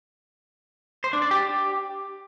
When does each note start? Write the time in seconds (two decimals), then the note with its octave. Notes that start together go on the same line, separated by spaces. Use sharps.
1.04 C5
1.13 D4
1.22 D5
1.31 G4